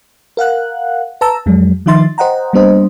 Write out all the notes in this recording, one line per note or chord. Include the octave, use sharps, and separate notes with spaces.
A#4 F5 F#5 F#6
B4 A5 A#5 E6
F2 F#3 G#3
D#3 F3 D#4 E5 C6 A6
C5 D#5 F#5 G5 A#5
G3 A#3 B3 D4 C5 D#5